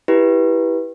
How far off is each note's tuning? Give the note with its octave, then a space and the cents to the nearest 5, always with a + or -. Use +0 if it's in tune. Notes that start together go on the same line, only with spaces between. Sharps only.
E4 +0 G4 +0 B4 -15